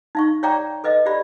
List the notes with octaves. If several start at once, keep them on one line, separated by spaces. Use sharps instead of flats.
D#4 F5 C#6
C#5 D5 F5 G5 A#5 D6
A4 B4 D#5 F5
G4 D5 F5 B5